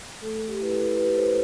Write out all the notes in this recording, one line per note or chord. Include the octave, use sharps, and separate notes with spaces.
A3 A4
G4
E4 B4
A4
A3 G4 B4
A4 C5